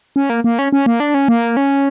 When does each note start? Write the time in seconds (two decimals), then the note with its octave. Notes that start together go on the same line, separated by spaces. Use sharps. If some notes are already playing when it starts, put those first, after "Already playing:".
0.16 C#4
0.30 A#3
0.44 A#3
0.59 C#4
0.73 C#4
0.86 A#3
1.00 D4
1.14 C#4
1.28 A#3
1.57 C#4